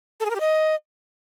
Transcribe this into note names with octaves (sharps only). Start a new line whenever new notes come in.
A4
G#4
A#4
G4
D#5